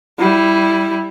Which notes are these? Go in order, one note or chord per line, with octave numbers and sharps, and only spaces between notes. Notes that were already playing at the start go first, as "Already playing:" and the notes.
G3 E4